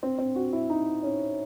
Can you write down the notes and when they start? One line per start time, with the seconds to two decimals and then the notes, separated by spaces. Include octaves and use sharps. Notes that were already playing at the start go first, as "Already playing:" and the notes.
0.03 C4
0.18 C4
0.36 F#4
0.53 E4
0.70 D#4
1.03 C#4